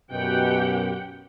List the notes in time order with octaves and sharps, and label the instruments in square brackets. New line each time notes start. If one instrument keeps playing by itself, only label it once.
[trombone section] F#2 B2 [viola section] G4 F#5 G5